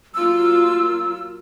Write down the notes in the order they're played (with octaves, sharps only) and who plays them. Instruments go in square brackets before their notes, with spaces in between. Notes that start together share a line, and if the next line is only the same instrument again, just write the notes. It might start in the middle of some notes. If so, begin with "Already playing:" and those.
[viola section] F#3 A#3 F4 [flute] E6